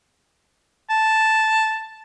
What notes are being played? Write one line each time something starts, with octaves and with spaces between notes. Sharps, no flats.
A5